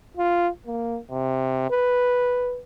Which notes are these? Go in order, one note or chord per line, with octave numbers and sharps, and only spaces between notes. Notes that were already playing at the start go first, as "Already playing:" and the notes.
F4
A#3
C3
B4